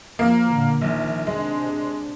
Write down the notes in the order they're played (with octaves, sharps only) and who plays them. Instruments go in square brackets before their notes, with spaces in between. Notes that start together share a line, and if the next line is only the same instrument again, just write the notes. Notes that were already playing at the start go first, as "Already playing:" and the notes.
[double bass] F3 [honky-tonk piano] A#3
[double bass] A#2 D3
[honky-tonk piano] A#1 [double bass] D#3
[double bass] C3 D4 [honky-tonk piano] G#3